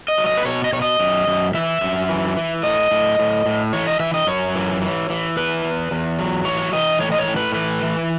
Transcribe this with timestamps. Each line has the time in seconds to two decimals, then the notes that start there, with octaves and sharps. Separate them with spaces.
0.08 D#5
0.18 F#3
0.27 D#5
0.37 B4
0.45 B2 C#5
0.64 D#5
0.73 B2 C#5
0.82 D#5
1.00 F#2
1.28 F#2
1.54 E3 E5
1.81 F#2
2.09 E3
2.37 E3
2.63 A2 D#5
2.91 A2
3.19 A2
3.46 A2
3.73 E3 C#5
3.87 D#5
4.00 E3 E5
4.14 D#5
4.27 F#2 C#5
4.55 E3
4.82 E3
5.10 E3
5.36 E2 B4
5.64 E2
5.91 E2
6.19 F#3
6.45 E3 C#5
6.73 E3 D#5
7.00 A2 C#5
7.12 D#5
7.18 C#5
7.27 A2
7.36 B4
7.54 E3 B4
7.83 E3